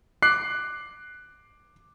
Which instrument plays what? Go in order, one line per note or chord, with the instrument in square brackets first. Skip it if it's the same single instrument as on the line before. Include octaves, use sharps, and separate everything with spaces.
[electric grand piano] D6 F#6 C7